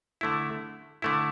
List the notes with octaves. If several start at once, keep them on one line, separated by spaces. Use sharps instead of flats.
D3 A3 E4
D3 A3 E4